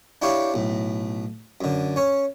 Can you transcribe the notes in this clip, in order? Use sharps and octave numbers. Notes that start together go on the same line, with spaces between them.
D4 E4 G4 C#5 F5 C#6
B1 A2
F#2 D3
C#4 C#5